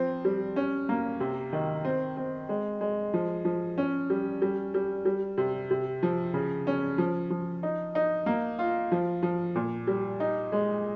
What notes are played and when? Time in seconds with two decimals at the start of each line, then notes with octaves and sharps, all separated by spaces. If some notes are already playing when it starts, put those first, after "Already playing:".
Already playing: F3 C4
0.25 G3
0.56 C#4
0.89 A#3
1.20 C3
1.53 D#3
1.85 C4
2.17 C4
2.49 G#3
2.81 G#3
3.14 F3
3.45 F3
3.78 C#4
4.10 G3
4.42 G3
4.74 G3
5.05 G3
5.38 C3
5.71 C3
6.03 F3
6.34 C#3
6.67 C#4
6.98 F3
7.30 F3
7.63 D#4
7.95 D#4
8.26 A#3
8.59 F4
8.92 F3
9.23 F3
9.55 A#2
9.87 G3
10.20 D#4
10.52 G#3